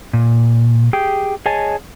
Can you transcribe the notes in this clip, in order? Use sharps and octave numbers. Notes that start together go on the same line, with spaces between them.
A#2
G4 G#4 G5
G#4 C#5 D#5 G#5 A5